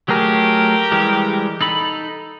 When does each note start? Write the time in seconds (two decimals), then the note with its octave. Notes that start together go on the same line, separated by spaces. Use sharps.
0.08 F#3 A3 G4 G#4 A#4
0.92 E3 G3 G#3
1.61 D#4 A4 B5